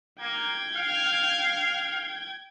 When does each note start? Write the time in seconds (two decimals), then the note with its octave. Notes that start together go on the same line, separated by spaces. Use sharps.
0.21 A#3 G5 G#6
0.75 F5